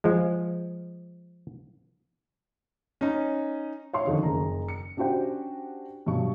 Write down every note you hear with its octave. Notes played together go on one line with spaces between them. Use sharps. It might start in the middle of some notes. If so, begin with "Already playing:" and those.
F3 G#3
C#4 D#4
C#5 E5 F5 C6 C#6
F2 D3 D#3 C#4 D4
F#1 A#5
C#7
C#4 D4 F#4 G4 C5 G5
G2 B2 F#3 C#6